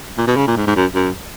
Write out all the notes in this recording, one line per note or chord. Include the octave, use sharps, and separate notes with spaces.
A#2
B2
C#3
A#2
G#2
G#2
F#2
F#2